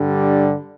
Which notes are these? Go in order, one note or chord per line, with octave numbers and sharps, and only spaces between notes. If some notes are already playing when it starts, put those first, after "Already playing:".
Already playing: G2 D3 G3